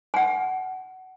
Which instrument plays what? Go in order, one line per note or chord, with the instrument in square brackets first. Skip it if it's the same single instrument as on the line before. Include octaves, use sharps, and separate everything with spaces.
[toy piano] F#5 G#5